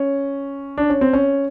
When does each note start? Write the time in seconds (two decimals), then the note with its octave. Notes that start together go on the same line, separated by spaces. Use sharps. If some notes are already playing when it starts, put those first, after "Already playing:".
Already playing: C#4
0.78 D4
0.90 C#4
1.01 C4
1.13 C#4